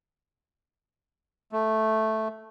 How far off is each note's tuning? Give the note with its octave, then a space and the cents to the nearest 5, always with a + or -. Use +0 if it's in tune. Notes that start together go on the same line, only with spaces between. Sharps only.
A3 -5